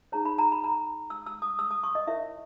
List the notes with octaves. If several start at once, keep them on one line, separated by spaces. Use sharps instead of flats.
D#4 G#4 C#5 A#5
B5
A#5
B5
A#5
E6
E6
D#6
E6
D#6
C#6
D#5
E4 A#4 C#5 E5